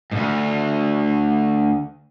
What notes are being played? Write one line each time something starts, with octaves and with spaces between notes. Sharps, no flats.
D2 G#2